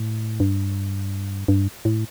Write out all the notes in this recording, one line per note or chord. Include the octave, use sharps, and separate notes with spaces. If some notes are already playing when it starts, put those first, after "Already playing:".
Already playing: A2
G2
G2
A2